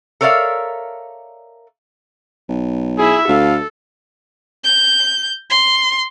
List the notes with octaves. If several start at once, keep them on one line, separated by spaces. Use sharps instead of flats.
A4 A#4 C#5 D5 E5 F5
B1
E4 G#4 E5
D2 A4 F5
G6
C6